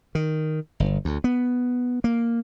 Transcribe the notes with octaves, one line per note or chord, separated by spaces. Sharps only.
D#3
G1
D2
B3
A#3